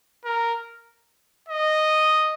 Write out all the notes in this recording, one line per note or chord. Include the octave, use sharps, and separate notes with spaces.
A#4
D#5